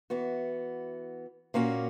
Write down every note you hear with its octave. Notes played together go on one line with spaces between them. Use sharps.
E3 B3 F#4
A#2 A#3 C#4 F#4